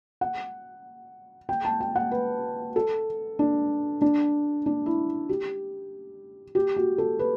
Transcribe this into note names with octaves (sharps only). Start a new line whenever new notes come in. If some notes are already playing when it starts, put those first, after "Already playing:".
F#5
G5
A5
G5
F#5
B4
A4
D4
D4
D4
E4
G4
G4
F#4
A4
B4